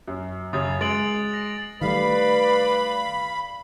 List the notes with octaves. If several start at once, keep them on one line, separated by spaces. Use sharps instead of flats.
F#2
F#2 C#3 D#6 A6
G#3 A6 D7 F#7
A#6
D#3 G3 A3 B4 D5 F5 B5